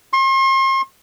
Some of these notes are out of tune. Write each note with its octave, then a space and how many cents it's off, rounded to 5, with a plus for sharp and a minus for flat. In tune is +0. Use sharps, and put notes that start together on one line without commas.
C6 +40